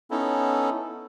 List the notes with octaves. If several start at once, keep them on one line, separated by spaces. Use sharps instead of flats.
B3 C#4 D#4 E4 A4